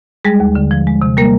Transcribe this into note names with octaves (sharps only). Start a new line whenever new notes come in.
G3 G#3 G#4
D#2
D3
F3
G#3
C3
G3 A#3 A#4